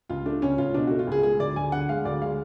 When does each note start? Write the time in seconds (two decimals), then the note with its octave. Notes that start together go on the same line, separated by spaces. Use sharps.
0.09 C#2 F4
0.26 A3 D4
0.42 C#2 C#4
0.58 C#2 F4
0.74 B2 D4
0.87 A3 F#4
0.99 F4
1.07 C#2 G#4
1.23 G#3 G#4
1.40 D2 D5
1.56 D2 G#5
1.72 D3 F#5
1.89 G#3 F5
2.05 D2 D5
2.21 G#3 F5